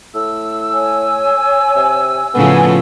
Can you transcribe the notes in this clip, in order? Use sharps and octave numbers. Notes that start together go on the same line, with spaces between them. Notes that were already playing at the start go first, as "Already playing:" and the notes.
A2 E6
C#5 G#5
C3
A2 C#3 F3 B3 G#5